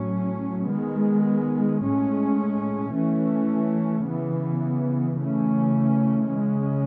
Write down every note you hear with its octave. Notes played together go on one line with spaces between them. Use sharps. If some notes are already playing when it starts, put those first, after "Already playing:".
Already playing: A2 F#3 C#4
D#3 G#3 B3
A2 G#3 C#4
E3 A3 C#4
C#3 E3 B3
C#3 E3 A3 C#4
C#3 G#3 C#4